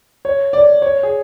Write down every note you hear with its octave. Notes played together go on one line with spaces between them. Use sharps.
C#5
D5
C#5
G#4